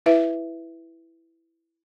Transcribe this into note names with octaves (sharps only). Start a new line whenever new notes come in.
E4 B4 E5